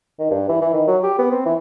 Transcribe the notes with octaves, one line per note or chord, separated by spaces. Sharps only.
D#3
G2
E3
E3
D#3
F#3
G4
B3
C4
E3